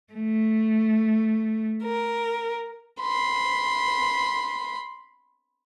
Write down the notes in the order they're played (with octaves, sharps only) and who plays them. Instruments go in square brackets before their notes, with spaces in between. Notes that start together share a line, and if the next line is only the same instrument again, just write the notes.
[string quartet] A3
A#4
[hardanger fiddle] B5 C6